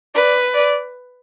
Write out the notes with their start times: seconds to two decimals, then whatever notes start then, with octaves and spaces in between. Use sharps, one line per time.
0.15 B4 D5
0.54 D5